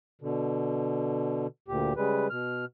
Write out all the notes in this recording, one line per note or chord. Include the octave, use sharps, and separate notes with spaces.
B2 D3
D2 A#2 G4
C#3 G3 G#3 B4
B2 F6